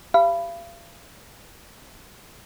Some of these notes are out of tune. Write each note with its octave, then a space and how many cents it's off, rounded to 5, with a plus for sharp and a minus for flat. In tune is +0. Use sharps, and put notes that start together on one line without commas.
G4 +0 F5 -40 B5 +5